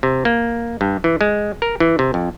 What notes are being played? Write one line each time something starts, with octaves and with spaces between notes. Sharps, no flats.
C3
A#3
G2
E3
G#3
A#4
E3
C3
F2